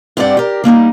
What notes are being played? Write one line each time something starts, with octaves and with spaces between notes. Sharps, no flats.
G2 C4 G4 D5 F#5
G4 A#4
G3 A#3 D4 D#4